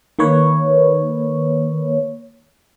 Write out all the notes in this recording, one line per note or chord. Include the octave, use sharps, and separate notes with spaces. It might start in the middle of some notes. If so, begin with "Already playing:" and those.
D#3 A#3 B4 C#5